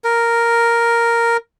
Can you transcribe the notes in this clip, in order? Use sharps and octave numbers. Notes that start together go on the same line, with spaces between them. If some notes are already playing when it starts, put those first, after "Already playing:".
A#4